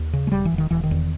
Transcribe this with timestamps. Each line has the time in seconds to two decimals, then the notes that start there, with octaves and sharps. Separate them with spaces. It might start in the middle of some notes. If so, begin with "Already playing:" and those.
Already playing: D#2
0.13 C#3
0.27 G#3
0.32 E1 G3
0.45 E3
0.52 E1
0.58 D#3
0.71 E1 E3
0.83 D#3
0.91 E2